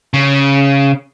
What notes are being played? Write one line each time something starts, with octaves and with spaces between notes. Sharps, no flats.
C#3